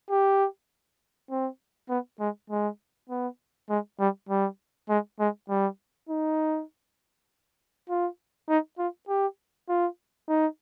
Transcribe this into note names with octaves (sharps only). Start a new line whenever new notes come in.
G4
C4
B3
G#3
G#3
B3
G#3
G3
G3
G#3
G#3
G3
D#4
F4
D#4
F4
G4
F4
D#4